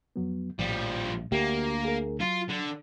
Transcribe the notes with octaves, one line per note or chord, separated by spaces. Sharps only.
F2 F#3 B3
A#1 A2 F3 G3
D2 A#3 G4
G#4 A#4
F#3 F4
D3